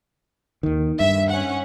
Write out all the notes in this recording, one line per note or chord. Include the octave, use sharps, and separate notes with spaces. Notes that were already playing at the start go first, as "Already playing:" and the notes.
D#2 D#3
G2 E5
C#4 F#5